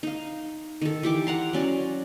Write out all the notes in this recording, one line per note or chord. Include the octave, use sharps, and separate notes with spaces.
D#4 F5
D#3 A4
E3 G4 D6
F#5 A#5 C6
F#3 C#4 D5